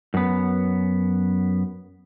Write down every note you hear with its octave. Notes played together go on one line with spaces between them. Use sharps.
F#2 B3